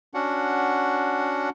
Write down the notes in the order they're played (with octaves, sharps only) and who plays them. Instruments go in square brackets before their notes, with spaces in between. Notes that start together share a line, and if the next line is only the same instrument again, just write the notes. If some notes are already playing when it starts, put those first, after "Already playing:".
[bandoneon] C#4 D4 F#4 F#5